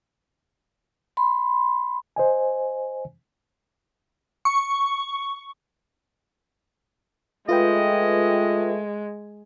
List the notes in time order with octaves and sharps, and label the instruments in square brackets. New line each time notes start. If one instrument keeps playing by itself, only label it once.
[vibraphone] B5 C6
[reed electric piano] C5 D#5 G#5
[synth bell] C#6
[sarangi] G#3 [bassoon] A3 [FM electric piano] F4 B4 G5 [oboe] D#5